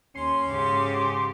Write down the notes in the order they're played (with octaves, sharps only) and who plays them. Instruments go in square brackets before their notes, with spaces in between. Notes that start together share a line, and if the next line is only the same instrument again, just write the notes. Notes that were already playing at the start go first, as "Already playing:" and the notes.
[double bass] D#2 [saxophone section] C#4 [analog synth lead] C6
[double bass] G#2 [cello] C#3 G4